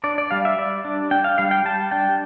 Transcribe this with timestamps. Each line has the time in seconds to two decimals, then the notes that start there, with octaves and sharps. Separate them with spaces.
0.04 D4 D5
0.18 D5
0.31 G3 F5
0.45 E5
0.58 G3 D5
0.85 D4
1.11 D4 G5
1.24 F5
1.38 G3 F5
1.51 G5
1.65 G3 A5
1.91 D4 G5